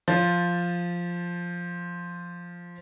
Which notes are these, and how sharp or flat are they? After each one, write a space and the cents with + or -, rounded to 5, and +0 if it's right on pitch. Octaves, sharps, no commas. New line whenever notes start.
F3 +0 F4 +0